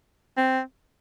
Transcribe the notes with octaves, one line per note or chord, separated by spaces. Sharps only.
C4